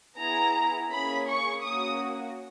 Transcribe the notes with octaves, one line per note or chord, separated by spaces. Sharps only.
B3 E4 G#4 A#5
A#3 C#4 G#4 B5
C#6
A#3 C#4 F#4 D#6